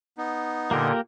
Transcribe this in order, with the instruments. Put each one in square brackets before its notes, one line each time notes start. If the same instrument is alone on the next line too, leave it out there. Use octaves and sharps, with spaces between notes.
[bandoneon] B3 D#4
[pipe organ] A#2 D3 [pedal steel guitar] A#3 G4 A#4